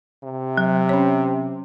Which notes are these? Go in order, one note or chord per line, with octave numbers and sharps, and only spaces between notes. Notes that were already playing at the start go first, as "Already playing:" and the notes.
C3
F#3
C#4 C#5